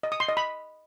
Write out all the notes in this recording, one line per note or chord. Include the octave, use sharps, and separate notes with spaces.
D#5
D#6
C6
D#5
B5